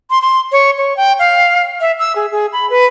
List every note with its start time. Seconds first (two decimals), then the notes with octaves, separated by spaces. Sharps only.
0.10 C6
0.22 C6
0.52 C#5
0.78 C#5
0.96 G5
1.19 F5
1.81 E5
1.99 E6
2.15 G#4
2.32 G#4
2.53 B5
2.70 B4